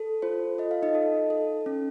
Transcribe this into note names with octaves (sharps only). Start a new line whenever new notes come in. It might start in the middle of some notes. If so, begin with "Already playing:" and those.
Already playing: A4
F4 C5
A4 D#5
F5
D#4 D#5
A4
A4
C#4